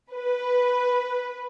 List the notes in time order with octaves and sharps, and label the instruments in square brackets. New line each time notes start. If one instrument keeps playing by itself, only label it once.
[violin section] B4